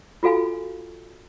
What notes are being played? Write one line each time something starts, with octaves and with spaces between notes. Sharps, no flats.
F4 F#4 A4 F5 G#5